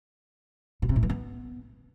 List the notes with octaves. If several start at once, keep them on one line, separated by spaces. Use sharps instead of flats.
B2
C3
A2
E3
B3